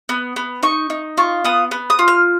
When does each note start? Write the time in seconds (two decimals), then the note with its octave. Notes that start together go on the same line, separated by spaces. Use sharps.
0.09 B3
0.36 B3
0.63 D#4 C#6
0.90 D#4
1.17 F4 C#6
1.44 B3 D#6
1.71 B3
1.90 D#6
1.99 F4
2.08 F6